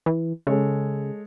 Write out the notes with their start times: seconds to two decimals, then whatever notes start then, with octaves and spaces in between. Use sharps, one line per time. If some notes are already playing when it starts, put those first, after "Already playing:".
0.06 E3
0.47 C#3 G#3 A4 C#5